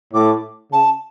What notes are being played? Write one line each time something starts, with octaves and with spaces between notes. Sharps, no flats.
A2 D6
C#3 A5